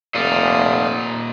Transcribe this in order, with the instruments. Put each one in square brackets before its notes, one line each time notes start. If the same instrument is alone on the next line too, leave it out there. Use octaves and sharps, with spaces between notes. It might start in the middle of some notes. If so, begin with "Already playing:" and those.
[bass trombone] F1 [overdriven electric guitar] A#2 D#4 [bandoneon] D5 F5 D#6